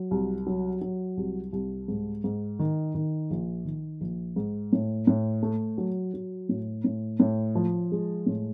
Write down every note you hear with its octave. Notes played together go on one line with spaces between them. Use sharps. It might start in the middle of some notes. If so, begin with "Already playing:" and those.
Already playing: F#3
C2
F#3
F#3
C2
C2
G#2
G#2
D#3
D#3
A#1
D#3
A#1
G#2
A2
A2
A3
F#3
F#3
A2
A2
A2
F3
G#3
A2